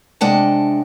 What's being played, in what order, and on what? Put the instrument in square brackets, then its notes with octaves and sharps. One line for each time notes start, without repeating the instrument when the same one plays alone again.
[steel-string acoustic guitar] C3 G#3 D4 F#5 G5 A5